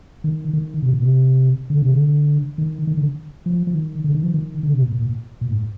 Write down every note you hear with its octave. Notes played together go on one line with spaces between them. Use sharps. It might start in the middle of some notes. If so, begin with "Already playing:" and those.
D#3
D#3
C3
A#2
C3
D3
C3
D3
D#3
D#3
D3
F3
F3
D#3
D3
D#3
F3
D#3
D3
C3
A#2
A#2
A#2
A#2
G#2